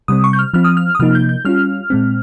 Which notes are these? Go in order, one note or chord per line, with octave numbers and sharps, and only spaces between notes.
C3 G3 C4 D#6
C#6
G6
F6
F3 C4 F4 F6
D#6
F6
D#6
C3 F3 A#3 D#4 F6
G6
G6
G3 C#4 F4 F6
A#2 G#3 C4